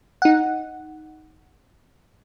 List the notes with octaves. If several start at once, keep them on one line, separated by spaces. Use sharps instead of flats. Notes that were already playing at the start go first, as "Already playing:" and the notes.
D#4 F#5